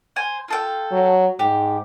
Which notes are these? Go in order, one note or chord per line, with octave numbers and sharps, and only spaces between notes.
C5 G#5
F4 A4 G5
F#3
G#2 G4